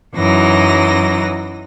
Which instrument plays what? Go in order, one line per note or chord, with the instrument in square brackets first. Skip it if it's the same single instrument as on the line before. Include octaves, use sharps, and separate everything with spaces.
[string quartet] F#2 E3 F#3 D#4 A#6